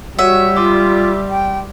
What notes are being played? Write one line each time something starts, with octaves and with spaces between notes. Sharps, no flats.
G3 F#4 C#5 E5 F#5
F4 D5 C6 D6
G5